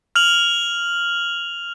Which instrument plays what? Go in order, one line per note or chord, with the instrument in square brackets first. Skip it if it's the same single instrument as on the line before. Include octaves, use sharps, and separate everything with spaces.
[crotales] F6 F7 F#7